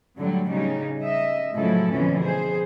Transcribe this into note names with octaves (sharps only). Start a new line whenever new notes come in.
A2 D3 F#3 G3
C#3 G3 D#4
D#5 E5
A2 C#3 F3 F#3 E4 A4
F2 B2 D3 E3 C#4
G#4 C5